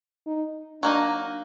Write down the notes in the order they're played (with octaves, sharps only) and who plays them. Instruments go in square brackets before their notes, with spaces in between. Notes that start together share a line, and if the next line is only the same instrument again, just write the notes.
[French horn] D#4
[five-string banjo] F#3 A#3 D#4 [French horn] D4